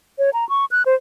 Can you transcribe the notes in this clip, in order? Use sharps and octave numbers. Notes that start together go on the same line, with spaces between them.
C#5
A#5
C#6
F#6
C5